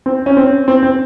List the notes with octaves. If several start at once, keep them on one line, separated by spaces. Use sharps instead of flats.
C4
C#4
C4
C4
C4